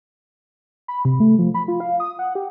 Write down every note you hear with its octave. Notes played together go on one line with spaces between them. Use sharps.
B5
C3
A3
F3
B5
F4
F5
D#6
F#5
G4